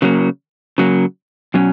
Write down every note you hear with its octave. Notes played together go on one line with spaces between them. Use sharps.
C#3 F#3 A#3
C#3 F#3 A#3
B2 F#3 C#4